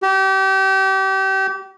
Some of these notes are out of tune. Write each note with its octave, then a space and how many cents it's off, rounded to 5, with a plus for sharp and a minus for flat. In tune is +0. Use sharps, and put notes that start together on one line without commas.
G4 -30